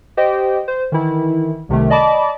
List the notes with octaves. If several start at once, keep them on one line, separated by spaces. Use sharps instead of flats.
G4 C5 D#5 G5
C5
D#3 E3 E4
C2 C3 D#3 A3
D5 D#5 A5 B5 D6